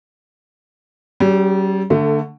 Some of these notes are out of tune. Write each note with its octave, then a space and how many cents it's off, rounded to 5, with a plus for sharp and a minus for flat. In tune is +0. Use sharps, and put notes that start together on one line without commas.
G3 -40 C#4 +0 G4 +35
D3 +0 A3 +20